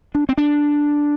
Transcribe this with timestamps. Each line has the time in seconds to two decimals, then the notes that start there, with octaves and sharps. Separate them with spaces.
0.15 D4
0.29 C4
0.38 D4